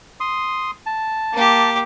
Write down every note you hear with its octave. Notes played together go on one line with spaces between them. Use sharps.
C6 D#6
A5
A#3 G4